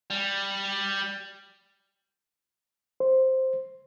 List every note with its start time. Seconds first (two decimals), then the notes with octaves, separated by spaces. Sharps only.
0.10 G3
3.00 C5